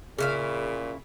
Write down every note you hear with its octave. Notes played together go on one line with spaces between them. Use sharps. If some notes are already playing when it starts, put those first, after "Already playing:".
A#2 C#3 E4 G#4 F5